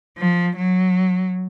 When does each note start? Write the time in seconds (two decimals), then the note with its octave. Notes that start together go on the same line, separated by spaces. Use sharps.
0.18 F3
0.57 F#3